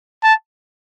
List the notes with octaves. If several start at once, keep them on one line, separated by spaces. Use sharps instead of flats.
A5